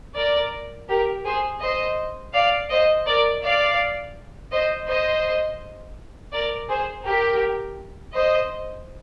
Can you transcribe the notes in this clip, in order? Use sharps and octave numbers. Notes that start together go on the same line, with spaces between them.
A#4 D5
G4 A#4
G#4 C5
C5 D#5
D5 F5
C5 D#5
A#4 D5
D5 F5
C5 D#5
C5 D#5
A#4 D5
G#4 C5
G4 A#4
C5 D#5